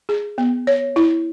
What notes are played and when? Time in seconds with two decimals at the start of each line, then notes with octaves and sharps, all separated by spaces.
0.09 G#4
0.38 B3
0.67 C#5
0.96 E4